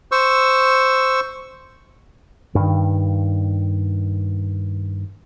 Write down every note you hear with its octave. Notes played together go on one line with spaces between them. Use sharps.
C5 C#6 E6
G2 D#3